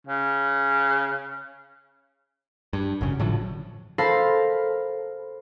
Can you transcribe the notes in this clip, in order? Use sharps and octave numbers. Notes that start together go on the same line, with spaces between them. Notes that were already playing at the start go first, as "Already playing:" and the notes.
C#3
G2
G#1 F#2 C#3
A2 D3 F3 F#3
A4 A#4 C5 F5 A5 B5